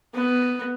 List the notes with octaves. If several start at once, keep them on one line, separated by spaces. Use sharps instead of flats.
B3